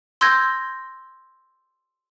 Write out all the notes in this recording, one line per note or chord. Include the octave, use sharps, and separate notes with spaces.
C6 E6 G6 G#6 A#6